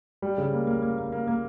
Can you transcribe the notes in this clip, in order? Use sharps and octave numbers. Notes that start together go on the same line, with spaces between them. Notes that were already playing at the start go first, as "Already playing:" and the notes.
G3
C#3
A#3
A#3
A#3
A#3
A#3
A#3